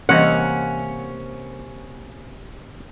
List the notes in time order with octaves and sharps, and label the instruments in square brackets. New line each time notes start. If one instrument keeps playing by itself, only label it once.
[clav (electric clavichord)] C3 A#3 [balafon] E3 G3 D#5 [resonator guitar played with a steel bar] C#4 [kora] F#5